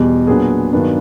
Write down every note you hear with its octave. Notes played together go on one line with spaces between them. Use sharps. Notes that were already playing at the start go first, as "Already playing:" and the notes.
Already playing: E2 B2 G3
A#2 F#3 B3 D4 G#4
G2 D#3 F#3 B3 D4